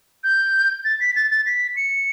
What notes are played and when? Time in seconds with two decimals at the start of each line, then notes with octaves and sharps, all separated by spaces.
0.24 G6
0.85 A6
1.00 B6
1.16 A6
1.31 A6
1.46 B6
1.77 C#7